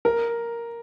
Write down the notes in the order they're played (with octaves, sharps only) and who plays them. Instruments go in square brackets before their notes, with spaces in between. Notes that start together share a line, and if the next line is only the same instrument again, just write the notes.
[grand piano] A#4